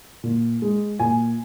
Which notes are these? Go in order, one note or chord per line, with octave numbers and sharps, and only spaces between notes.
A#2
G#3
A#2 G#5